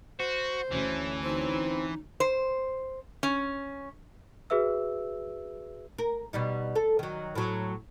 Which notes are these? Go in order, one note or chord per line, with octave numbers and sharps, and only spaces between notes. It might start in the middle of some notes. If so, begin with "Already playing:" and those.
F#4 C5
D2 E3 C#4
C4 D#4
C5
C#4
F#4 G#4 B4 E5 E6
A#4
B2 G3 D#4
A4
D#3 F#3
A2 F#3